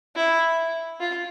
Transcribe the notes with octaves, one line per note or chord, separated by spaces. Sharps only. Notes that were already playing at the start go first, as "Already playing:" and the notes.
E4
F4